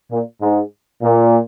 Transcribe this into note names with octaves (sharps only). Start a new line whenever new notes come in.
A#2
G#2
A#2